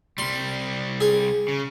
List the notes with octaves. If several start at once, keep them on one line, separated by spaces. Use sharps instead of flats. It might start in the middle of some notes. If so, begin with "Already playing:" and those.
C2 G3 C6
G#4
C#3